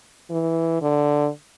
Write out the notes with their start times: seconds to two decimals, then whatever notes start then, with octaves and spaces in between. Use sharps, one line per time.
0.30 E3
0.82 D3